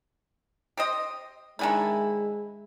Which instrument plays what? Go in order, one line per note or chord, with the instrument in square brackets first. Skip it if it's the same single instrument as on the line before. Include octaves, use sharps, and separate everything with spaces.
[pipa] G4 C5 D#5
[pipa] D#3 D4 E4 [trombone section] G#3 [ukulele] C5 E5 G#5